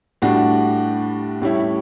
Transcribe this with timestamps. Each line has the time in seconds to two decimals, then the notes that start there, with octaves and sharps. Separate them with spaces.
0.22 A2 G3 D4 F#4
1.42 A2 G3 C#4 E4